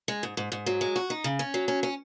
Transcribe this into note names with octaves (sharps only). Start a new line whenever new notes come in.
G#3
G#2
G#2
G#2
F#3
G#3
F#4
D#4
C#3
C#4
F#3
C#4
C#4